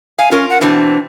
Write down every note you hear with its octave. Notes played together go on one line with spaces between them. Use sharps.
F5 G#5
C#4 F4 A#4
F#5
B2 E3 C4 D4